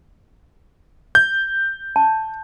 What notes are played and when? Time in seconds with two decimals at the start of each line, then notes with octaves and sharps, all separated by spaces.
1.15 G6
1.96 A5